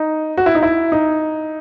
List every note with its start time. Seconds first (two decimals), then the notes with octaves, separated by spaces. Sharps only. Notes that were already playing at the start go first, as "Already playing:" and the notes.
Already playing: D#4
0.37 F#4
0.46 E4
0.55 D#4
0.62 E4
0.92 D#4